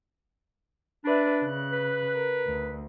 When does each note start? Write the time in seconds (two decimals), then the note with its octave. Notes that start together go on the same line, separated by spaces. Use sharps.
1.04 D4 B4 D5 E5
1.42 C#3 F#6
1.72 B4
2.14 A#4
2.47 D2